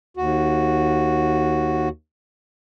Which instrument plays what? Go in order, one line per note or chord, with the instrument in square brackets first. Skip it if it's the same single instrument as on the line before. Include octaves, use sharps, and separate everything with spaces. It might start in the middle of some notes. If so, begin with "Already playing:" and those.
[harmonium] D#2 F#4